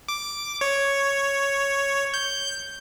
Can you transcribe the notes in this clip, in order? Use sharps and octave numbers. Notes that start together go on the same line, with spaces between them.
D6
C#5
G6